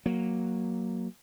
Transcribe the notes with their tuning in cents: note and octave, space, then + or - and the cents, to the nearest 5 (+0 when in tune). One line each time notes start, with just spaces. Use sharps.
F#3 +0 A#3 +0